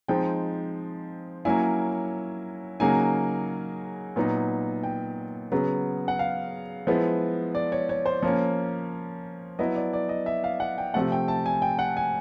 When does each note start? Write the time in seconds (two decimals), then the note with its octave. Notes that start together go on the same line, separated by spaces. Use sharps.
0.08 F3 G#3 C4 D#4 G5
1.45 F#3 A#3 C#4 E4 G#5
2.80 C#3 F#3 A#3 D#4 G#5
4.16 A#2 F#3 B3 D#4
4.83 G5
5.52 C#3 F#3 B3
6.08 F#5
6.19 F5
6.87 F3 G#3 B3 E4
7.55 D5
7.72 C#5
7.89 C#5
8.06 C5
8.23 F3 A#3 C#4 C#5
9.59 F#3 B3 E4 D#5
9.76 D5
9.93 D5
10.09 D#5
10.26 E5
10.44 F5
10.60 F#5
10.78 G5
10.94 C3 F3 A3 F#5
11.12 G5
11.28 A5
11.46 G#5
11.62 G5
11.79 F#5
11.97 G#5